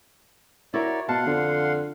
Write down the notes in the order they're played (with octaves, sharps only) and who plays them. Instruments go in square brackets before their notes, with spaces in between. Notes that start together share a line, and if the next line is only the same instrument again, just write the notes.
[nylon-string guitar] E4 F#4 A#4 [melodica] C#5 D5
[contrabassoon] B2 [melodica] F5 F#5 C6 [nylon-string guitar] A5
[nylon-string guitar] F2 [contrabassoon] D3